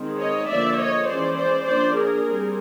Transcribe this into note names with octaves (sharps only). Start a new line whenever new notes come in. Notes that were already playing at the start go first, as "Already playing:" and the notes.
Already playing: D#3 G#3 C4
C#5 D#5
D3 F3 A#3 D5 E5
C#5 D#5
E3 G#3 C#4 C5 D5
C5 D5
F3 A#3 D4 C5 D5
G#4 A#4
G3 C4